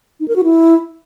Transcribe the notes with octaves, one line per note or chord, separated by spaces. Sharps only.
D#4
A#4
F#4
E4